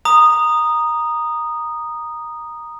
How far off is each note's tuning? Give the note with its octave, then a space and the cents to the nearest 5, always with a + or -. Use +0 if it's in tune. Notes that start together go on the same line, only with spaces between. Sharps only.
A#5 +5 D#6 -10